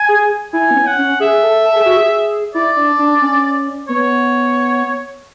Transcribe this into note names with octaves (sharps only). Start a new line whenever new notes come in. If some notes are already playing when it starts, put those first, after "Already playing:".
Already playing: G#5
G#4
E4 G#5
B3
C#4
F#5
C#4
G#4 E5
A4
A4
G#4
F#4
G#4
E4 D5
D4
D4
C#4
B3 C#5